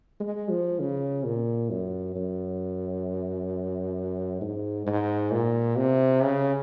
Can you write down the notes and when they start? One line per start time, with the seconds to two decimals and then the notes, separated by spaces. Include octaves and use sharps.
0.20 G#3
0.50 F3
0.80 C#3
1.25 A#2
1.70 F#2
2.16 F#2
4.41 G#2
4.86 G#2
5.31 A#2
5.76 C3
6.21 C#3